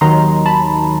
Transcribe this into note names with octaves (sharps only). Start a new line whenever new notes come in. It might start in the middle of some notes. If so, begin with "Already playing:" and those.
D#2 D#3 F#3 A#5 C6
A5 B5